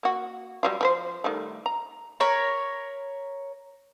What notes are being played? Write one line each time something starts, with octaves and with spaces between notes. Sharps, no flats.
A#3 F#4
F#3 G3 F4
F3 B4 C5
D#3 G3 A3
A#5
A#4 C#5 B5